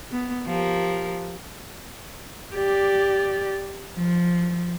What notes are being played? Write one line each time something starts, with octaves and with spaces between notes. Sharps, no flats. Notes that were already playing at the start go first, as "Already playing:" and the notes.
B3
F3 G4 A#4
G4 D5
F3